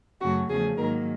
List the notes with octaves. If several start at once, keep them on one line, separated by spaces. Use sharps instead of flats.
F#2 C#3 F#3 A3 F#4
E2 C#3 F3 A3 G#4
G#2 D#3 F#3 A#3 A#4